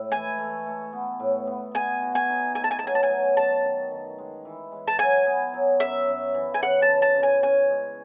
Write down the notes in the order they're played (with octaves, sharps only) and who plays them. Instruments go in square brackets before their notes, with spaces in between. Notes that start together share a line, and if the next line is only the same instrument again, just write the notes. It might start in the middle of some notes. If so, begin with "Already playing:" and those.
Already playing: [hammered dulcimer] A2 G#3
[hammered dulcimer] E3 [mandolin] G#5
[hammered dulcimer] A3
A3
B3
A2
B3
[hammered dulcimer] B2 [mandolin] G#5
[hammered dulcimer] F#4
[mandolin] G#5
[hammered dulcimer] D#4
[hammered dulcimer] A3 [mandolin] G#5
[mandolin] A5
G#5
A5
[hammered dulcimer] F#3 [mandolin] G#5
[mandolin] A5
G#5
[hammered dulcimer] F#3
[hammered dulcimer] F#2 [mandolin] A5
[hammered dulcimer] D#3
D#3
G#3
E3
G#3
[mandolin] A5
[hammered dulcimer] F#3 [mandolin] G#5
[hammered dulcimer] B3
F#3
[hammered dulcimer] F#2 [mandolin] E5
[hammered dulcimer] F#2
E3
[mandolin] G#5
[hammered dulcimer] C#3 [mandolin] F#5
[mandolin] A5
[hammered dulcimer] C#3
[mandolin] A5
[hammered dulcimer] C#3
[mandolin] G#5
[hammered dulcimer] C#4 [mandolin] G#5
[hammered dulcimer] G#3